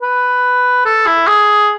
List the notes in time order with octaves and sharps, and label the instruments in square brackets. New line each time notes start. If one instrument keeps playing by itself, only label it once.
[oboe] B4
A4
E4
G#4